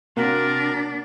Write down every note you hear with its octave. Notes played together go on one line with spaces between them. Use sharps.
C3 A#3 D4 F#4 A#4